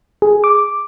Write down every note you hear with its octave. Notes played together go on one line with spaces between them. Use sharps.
G#4
D6